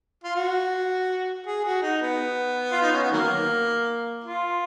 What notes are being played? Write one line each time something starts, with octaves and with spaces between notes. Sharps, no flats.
F4
F#4
G#4
F#4
D#4
B3
F4
D#4
C#4
B3
D#3 F#3 A#3
F4